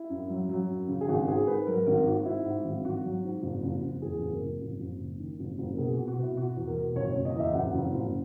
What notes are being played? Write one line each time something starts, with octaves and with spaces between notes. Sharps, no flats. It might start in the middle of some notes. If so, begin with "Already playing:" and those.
Already playing: E4
F#2
F#3
F#3
F#2
C#3
G#4
G#1 F#4
G#2 G#4
G#2 B4
F#3 A#4
G#1 A#4
G#2 F#4
G#2 E4
G#2
G#1
G#1 F#4
F#3
G#2
F#1
F#1
F#1
E2 G#4
F#1
A#4
F#1
F#1
F#1
F#1
D#3
F#1
F#1
A#4
B2 G#4
B2 F#4
F#4
B2 E4
B2 F#4
E2
A#4
B2
F#1 C#5
C#5
F#1
D#5
E2 E5
F#1 F#5
F#1
F#1